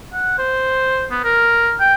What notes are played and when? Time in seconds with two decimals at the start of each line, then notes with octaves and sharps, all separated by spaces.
0.13 F#5
0.38 C5
1.11 B3
1.24 A#4
1.80 G5